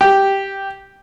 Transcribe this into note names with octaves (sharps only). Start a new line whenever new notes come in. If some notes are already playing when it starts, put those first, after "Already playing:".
G4